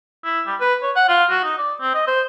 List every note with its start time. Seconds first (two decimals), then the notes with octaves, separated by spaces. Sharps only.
0.24 E4
0.46 G3
0.60 B4
0.83 C#5
0.96 F#5
1.09 F4
1.30 F#4
1.44 D#4
1.58 D5
1.81 C4
1.94 D#5
2.07 C5